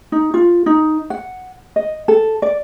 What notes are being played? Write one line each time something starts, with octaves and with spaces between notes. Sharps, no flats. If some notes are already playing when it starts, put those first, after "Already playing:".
D#4
F4
D#4
F#5
D#5
A4
D5